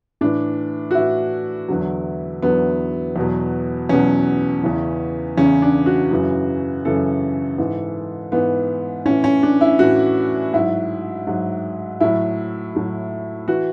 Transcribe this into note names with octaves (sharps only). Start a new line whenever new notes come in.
A2 E3 D4
F#4
A2 E3 E4
E2 D3 F#3
E2 D3 F#3 B3
E2 B2 F#3
E2 B2 F#3 C#4
E2 C#3 E3
E2 C#3 E3 C#4
D4
F#4
F#2 C#3 E3
F#2 C#3 E3 A4
G#2 E3
G#2 E3 B3
A2 E3 C#4
C#4
D4
E4
A2 E3 F#4
G#2 F#3 E4
G#2 F#3
A2 F#3 E4
A2 F#3
E3 F#4